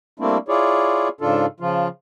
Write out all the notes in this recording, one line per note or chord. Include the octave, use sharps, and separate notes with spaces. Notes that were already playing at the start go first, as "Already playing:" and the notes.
G3 A3 A#3 C4 D4 E4
E4 F4 G#4 C#5 D5
G#2 C#3 D4 F4 A4
C#3 F3 F4